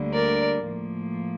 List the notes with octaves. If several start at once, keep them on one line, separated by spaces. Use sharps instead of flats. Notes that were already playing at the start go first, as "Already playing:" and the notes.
Already playing: D2 D3 G3 A#3
A#4 D5
A2 F3 A#3